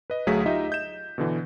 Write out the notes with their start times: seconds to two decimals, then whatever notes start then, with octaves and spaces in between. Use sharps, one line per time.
0.10 B4 D#5
0.27 D2 F#3 A3 G#4 F5 B6
0.46 D#4 F4 G4 D#5 E5
0.70 D#5 G6 E7
1.18 B2 D3 E3